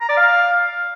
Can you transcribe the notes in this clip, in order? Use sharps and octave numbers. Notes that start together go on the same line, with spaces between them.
A#5
D5
F5